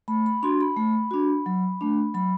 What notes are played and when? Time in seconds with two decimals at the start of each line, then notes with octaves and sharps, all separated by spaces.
0.08 A3 B5
0.26 B5
0.43 D4 F#4 C6
0.61 B5
0.77 A3
1.11 D4 F#4
1.46 F#3
1.81 A3 D4
2.14 F#3 B5